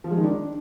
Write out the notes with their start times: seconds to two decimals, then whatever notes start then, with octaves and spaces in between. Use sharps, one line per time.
0.04 F3
0.11 G#3
0.17 D#3
0.24 D4